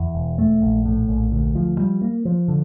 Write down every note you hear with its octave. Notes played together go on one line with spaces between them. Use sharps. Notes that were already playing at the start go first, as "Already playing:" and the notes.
Already playing: E2
E1
A3
A#1
A2
A#1
D2
F3
G3
A#3
F3
D3